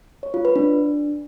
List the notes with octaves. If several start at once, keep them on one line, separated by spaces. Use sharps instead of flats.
C#5
F4
B4
D4